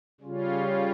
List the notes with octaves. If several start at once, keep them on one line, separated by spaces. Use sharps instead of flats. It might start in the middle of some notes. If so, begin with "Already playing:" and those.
C#3 G3 C#4 F4